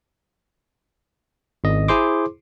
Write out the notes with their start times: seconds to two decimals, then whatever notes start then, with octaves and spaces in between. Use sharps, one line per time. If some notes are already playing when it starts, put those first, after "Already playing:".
1.64 G#1 D#5
1.88 E4 G#4 C5 C6 D6